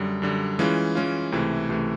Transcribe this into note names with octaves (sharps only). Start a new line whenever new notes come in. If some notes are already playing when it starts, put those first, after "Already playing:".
Already playing: F#2 D3 G3
F#2 D3 G3
E3 G#3 C#4 F4
E3 G#3 C#4 F4
C#2 C3 E3 A3
C#2 C3 E3 A3